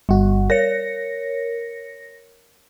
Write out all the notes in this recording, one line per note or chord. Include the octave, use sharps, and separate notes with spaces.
G1 G3 F#4
A#4 C#5 A#6 C#7